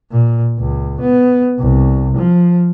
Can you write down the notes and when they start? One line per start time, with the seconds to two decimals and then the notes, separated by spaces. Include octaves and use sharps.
0.11 A#2
0.59 C#2
1.01 B3
1.59 C2
2.17 F3